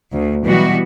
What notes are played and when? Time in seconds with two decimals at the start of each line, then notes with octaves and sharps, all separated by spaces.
0.12 D2
0.44 B2 E3 F#3 G3 B3 F#4